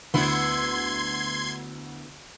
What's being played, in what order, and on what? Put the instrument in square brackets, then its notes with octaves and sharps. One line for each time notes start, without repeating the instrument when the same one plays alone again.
[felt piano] D2 [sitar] B3 E4 [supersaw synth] C6 G#6